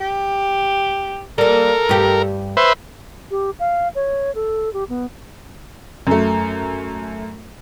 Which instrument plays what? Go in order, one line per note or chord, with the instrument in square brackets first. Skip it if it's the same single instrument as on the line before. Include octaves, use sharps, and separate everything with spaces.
[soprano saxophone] G4
[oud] G3 A#3 [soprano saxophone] A4 [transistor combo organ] A#4
[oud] G2 G4
[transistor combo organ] B4 C5 E5
[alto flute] G4
F5
C#5
A4
G4
B3
[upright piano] F#2 A3